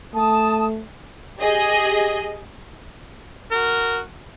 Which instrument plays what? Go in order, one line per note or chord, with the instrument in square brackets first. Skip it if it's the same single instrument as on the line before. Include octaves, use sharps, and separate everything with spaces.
[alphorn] A3 [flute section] A5 D#6
[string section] G4 G#4 D#5
[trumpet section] F#4 A#4